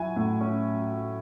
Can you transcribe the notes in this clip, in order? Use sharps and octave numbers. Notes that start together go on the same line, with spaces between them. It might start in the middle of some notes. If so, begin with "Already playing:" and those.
Already playing: F#3 E4 F#5 G#5
A2
C#4